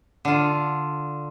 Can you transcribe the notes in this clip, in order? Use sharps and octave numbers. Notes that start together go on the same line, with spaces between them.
D3 F4